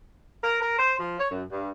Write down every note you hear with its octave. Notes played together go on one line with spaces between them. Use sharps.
A#4
A#4
C5
F3
C#5
F#2
G2